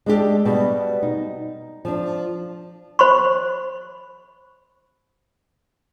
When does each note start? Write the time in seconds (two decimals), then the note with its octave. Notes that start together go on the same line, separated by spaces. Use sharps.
0.06 G#3 D4 G4 A4
0.45 B2 G3 B3
1.02 D#4
1.85 F3 D4
2.99 C5 B5 C#6